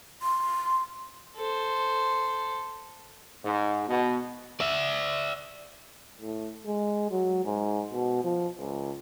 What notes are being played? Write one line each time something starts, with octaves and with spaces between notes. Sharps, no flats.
C6
A4 C5
G#2
B2
D5 E5
A2
G#3
F#3
G#2
B2
F3
C#2